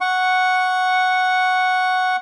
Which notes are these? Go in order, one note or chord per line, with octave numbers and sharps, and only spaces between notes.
F#5 C#6